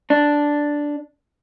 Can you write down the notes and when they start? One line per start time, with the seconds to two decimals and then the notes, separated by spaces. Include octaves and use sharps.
0.10 D4